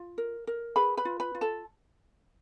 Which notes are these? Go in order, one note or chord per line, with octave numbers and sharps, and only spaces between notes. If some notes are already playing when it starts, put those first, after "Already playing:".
Already playing: F4
A#4
A#4
G#4 B4 B5
B4 B5
F4
B4 B5
F4
A4 A5